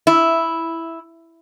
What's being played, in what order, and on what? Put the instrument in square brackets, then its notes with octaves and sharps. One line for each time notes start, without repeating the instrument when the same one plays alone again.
[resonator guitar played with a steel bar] E4